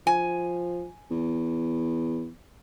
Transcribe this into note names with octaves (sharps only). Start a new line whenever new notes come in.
F3 G#5
E2